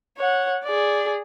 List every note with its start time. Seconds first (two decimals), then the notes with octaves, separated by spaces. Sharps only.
0.17 C#5 F#5
0.64 G#4 D5